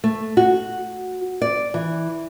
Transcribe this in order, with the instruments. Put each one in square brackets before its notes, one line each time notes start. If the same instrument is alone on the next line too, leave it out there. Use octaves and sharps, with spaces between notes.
[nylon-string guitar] A3
F#4
D5
E3